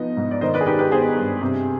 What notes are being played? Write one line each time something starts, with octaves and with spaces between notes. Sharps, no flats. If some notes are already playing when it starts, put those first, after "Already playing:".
Already playing: F3 B3 D#4 D#5
G#2
D5
D#3 C5 D#5
B4 D5
G#4
D#4 G4 B4
G4 B4
B3 G#4 C5
G2
C3